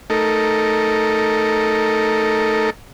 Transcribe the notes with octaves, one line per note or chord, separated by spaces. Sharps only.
A3 D#4 A4 A#4